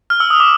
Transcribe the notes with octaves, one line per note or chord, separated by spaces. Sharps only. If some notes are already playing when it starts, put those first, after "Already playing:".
F6
E6
D#6
D6